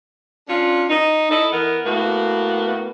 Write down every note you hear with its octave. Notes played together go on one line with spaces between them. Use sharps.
C#4 D4 F4
D#4
E4 A4 D#5
E3 B3 A#4
A2 A#3 B3 F#4